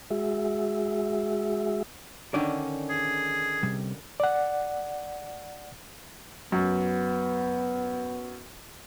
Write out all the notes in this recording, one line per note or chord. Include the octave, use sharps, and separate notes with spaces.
G#3 F#4 G#4 E5
D3 D#3 C#4 D5
G#4
C3 G3
D5 F#5
F#2 B3